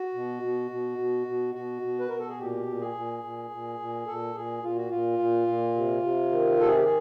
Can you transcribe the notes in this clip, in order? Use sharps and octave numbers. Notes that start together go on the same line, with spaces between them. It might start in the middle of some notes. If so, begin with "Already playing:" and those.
Already playing: F#4
B2
B2
B2
B2
B2
B2 F#4
B2
B4
B2 A#4
A4
G#4
A#2 G4
A#2
G#4
A#2
A#2
A#2
A#2
A#2 A4
A#2 G#4
A#2 F4
F#4
A#2 F4
A#2
A#2
C3
C3
D#3
C3 A4
G#4
G4
G#4